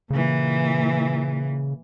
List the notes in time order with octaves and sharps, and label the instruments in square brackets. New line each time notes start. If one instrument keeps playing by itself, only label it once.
[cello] A#2 E3 [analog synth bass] C#3